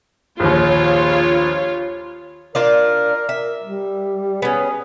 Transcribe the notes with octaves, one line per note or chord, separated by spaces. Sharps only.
A#1 D#2 F4 C#5
D4 F4 A#4 D5
E5
G3
B3 C#4 G#4